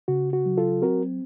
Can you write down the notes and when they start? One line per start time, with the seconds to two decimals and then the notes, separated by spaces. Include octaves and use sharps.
0.08 C#3 F#4
0.33 F#4
0.46 F#3
0.57 F4 A4
0.82 C4 F#4 A#4